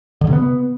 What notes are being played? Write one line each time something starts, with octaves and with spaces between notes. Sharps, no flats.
D3
C3
B3